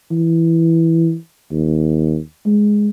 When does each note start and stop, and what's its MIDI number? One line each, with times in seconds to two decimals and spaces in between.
0.10 1.15 52
1.51 2.18 39
2.46 2.89 56